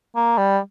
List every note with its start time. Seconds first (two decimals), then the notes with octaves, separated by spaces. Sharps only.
0.15 A#3
0.38 G3